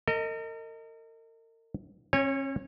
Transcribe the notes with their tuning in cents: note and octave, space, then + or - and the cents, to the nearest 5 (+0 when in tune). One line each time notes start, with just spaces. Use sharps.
A#4 -40 D#5 +5
C#4 -40 C#5 -5 G#5 -30